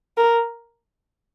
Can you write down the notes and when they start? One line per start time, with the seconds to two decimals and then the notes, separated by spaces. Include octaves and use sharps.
0.17 A#4